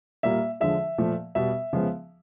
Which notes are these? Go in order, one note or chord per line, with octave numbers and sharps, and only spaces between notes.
A#2 G3 A#3 E5
D3 F3 G#3 E5
A#2 F3 A3
B2 G3 B3 E5
C#3 F3 G#3 B3